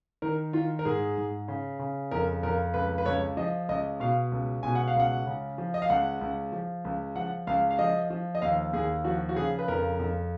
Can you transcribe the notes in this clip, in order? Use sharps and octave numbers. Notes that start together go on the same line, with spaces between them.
D#3 A#4
D#3 F4
A#4
G#2 G#4
G#2
C#3
C#3
F2 A#4
F2 A#4
C#2 B4
B4
C#2 C#5
F3 D#5
C#2 D#5
B2 F5
C#2
B2 G#5
F#5
F5
C#2 F#5
C#3
F3
D#5
F5
C#2 F#5
C#2
F3
C#2
F3 F#5
C#2 F5
F5
F3 D#5
F3
D#5
D#2 F5
D#2 G#4
F3 F#4
F#4
C#3 G#4
B4
F2 A#4
F2